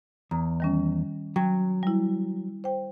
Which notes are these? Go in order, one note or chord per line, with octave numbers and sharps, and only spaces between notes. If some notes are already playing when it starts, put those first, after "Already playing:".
E2 A#5
D#3 G3 C#4
F#3 G5
G3 E4
C5 G5